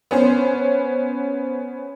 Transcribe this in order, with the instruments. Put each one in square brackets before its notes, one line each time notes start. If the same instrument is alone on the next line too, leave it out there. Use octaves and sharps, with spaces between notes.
[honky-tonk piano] B3 C#4 C5